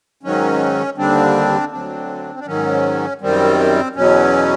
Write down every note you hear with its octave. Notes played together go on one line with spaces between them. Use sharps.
G#2 D#3 F#3 C#4
D#2 D3 G3 C4 D4
D2 D3 F#3 C4 D4
D4
G#2 D#3 F#3 C#4
F#2 D#3 G3 C4
E2 B2 F#3 C#4